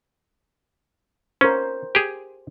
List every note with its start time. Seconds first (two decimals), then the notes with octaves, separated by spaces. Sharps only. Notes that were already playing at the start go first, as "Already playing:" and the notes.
1.41 C#4 A#4 C5
1.95 G4 G#4